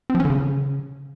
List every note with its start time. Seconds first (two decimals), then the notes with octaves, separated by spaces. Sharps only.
0.10 C4
0.15 F3
0.20 C#4
0.25 D3
0.30 C#3